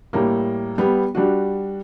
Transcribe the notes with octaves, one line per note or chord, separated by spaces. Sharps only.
A2 G3 A#3
G3 B3
G3 D4 F#4